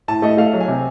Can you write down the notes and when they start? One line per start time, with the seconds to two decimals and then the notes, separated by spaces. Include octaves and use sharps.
0.08 A2 A5
0.22 A3 D#5
0.37 A3 F5
0.53 F#3
0.60 G#5
0.68 C3